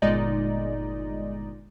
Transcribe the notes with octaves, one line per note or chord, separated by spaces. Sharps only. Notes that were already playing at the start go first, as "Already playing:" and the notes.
G1 A#2 G#3 D#4 D5 D#5